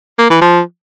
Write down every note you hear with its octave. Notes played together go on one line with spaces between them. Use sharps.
A#3
E3
F3